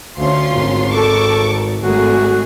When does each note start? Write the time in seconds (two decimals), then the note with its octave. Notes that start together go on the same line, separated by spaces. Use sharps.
0.18 D2 C#4 F4 C6
0.52 G#1
0.93 A4 A5 C#6 D6
1.83 G#1 G#3 A3 F#4 G#4